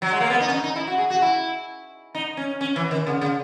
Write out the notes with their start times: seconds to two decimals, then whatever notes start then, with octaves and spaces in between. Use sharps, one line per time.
0.02 F#3
0.11 G#3
0.20 A#3
0.30 B3
0.41 D#4
0.48 C#4
0.53 D#4
0.64 D#4
0.76 E4
0.87 F#4
0.98 G#4
1.10 F#4
1.22 E4
2.15 D#4
2.37 C#4
2.61 C#4
2.76 E3
2.91 D#3
3.07 C#3
3.21 C#3